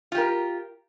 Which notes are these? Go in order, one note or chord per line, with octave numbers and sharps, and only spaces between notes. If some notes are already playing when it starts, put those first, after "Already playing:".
F4 G4 A#4